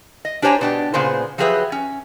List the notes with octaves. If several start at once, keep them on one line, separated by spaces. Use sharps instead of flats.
D#5
D4 G4 C5 C#5 G#5 A#5
B2 D4 G4
A#2 C#3 B3 G#4 C5
F3 F#3 G4 G#4 B4 E5
C#4